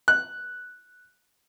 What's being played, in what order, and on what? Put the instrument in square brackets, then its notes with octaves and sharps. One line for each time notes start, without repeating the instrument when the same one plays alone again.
[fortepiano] F#6